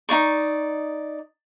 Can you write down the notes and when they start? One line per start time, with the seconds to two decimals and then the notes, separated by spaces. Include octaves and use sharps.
0.09 D#4 F4 D5 C#6